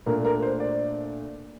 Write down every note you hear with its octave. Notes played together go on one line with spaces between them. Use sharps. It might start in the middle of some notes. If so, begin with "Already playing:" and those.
A#2 A3 D4 A#4
A#4
C5
D5